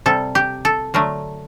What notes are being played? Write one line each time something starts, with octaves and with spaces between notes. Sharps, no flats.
C3 G3 A4
G4
A4
D3 F#3 A3 A#4